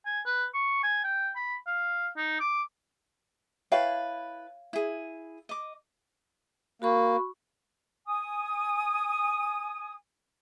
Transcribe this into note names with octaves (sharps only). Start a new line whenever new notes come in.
G#5
B4
C#6
G#5
G5
B5
F5
D#4
D6
E4 B4 C#5 F5 G5 A5
E4 G#4
D#5 D6
A#3 F#4 B5 C#6
G#5 D#6